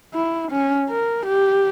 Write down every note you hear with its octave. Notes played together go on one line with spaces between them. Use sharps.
E4
C#4
A#4
G4